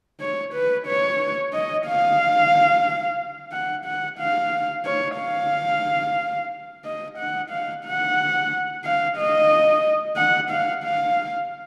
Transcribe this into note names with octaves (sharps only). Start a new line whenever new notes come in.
C#5
B4
C#5
D#5
F5
F#5
F#5
F5
C#5
F5
D#5
F#5
F5
F#5
F5
D#5
F#5
F5
F5